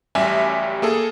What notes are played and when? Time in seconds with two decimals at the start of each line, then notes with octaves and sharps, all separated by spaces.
0.15 A1 F#2 G3 G4 E5 G#5
0.82 A#3 G#4 A4